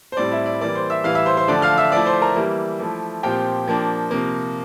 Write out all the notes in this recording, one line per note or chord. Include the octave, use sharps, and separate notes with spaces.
C5
A2 G3 C4 D5
E4 E5
D5
E3 G3 A#3 D5
C5 C6
E5 E6
A2 E3 G3 F5 F6
E5 E6
C5 C6
C5 C6
D3 F3 A3 D5 D6
F5 F6
E5 E6
F3 A3 E4 D5 D6
C5 C6
A#4 A#5
E3 G3 A#3 E4
F3 A3 E4
A#2 F3 C4 G4 G5
F3 A#3 D4
C3 F3 A#3